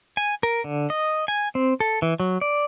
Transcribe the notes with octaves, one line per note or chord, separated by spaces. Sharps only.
G#5
A#4
D3
D#5
G#5
C4
A4
E3
F#3
D5